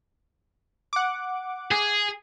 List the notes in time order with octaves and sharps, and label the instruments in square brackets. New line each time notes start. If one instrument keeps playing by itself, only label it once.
[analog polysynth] F#5 D6
[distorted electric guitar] G#4